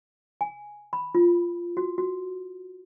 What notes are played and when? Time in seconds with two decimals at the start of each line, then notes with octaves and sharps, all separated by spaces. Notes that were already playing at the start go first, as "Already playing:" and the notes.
0.41 G#5
0.93 B5
1.15 F4
1.77 F#4
1.98 F#4